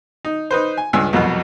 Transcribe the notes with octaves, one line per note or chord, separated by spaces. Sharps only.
D#4
D#4 B4 C5
G#5
C#2 G2 G#5 E6
C2 F2 B2 F#3